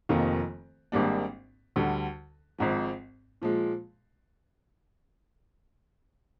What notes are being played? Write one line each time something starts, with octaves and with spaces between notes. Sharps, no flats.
F1 F2 D#3 A#3 F4
G#1 G#2 G3 A#3 D4
D2 D3 G3
G#1 G#2 F3
A#2 F3 G#3